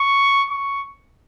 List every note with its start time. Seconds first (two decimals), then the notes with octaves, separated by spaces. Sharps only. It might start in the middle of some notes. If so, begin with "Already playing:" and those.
Already playing: C#6
0.51 C#6